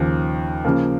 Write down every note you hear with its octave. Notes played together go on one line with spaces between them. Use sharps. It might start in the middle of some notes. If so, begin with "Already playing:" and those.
Already playing: D#2 C#3 F3
C#3 F3 A#3